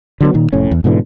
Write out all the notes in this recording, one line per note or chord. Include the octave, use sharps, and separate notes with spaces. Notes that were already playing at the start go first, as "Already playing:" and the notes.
D3 F#3 B3
A#2 D#3
F1 A2 C#4
E2
G#2 B2 D3 E3